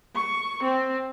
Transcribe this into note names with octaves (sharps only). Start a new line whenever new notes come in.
C#6
C4